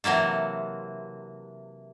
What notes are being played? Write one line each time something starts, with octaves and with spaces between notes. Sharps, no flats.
C3 E3 F#3 A#3 A4